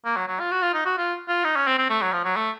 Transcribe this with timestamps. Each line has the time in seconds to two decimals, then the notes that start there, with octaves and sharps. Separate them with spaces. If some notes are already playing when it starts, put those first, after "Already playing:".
0.05 A#3
0.17 F#3
0.28 F#3
0.40 F4
0.52 F#4
0.62 F4
0.74 D#4
0.86 F#4
0.98 F4
1.29 F4
1.45 D#4
1.56 C#4
1.67 C4
1.79 C4
1.90 A3
2.02 F#3
2.13 F3
2.25 F#3
2.36 A3